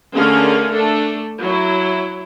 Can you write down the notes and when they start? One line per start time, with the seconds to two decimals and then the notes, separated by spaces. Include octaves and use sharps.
0.15 D3 A3 C#4 G#4 A#4 F5
0.73 A3 D4 A4
1.41 F#3 E4